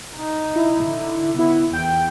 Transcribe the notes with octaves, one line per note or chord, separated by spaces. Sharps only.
D#4
E4
D3
B3 E4
E2 G5